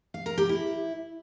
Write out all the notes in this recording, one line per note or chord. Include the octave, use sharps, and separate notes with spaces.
F5
A#4
G4
E4